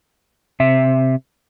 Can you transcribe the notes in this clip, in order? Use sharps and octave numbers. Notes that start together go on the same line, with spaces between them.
C3 E5